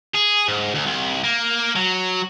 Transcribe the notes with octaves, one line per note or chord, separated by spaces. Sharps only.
G#4
G#2
D2
C2
A#3
F#3